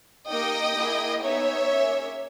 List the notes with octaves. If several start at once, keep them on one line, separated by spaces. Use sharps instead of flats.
A#3 D#4 G4 D#5 G5
A#3 E4 G#4
B3 D#4 G#4 C#5 E5
A#3 C#4 G#4